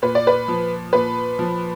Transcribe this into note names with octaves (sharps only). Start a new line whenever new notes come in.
A#2 B4
D5
B4
F3
A#2 B4
F3